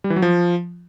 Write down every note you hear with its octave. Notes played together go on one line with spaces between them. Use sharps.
G3
E3
F#3
F3